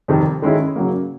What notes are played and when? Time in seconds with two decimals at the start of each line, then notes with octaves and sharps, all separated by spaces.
0.08 F2 C3 D#3 G3
0.42 D#3 G#3 C#4 E4
0.76 C#3 F#3 A#3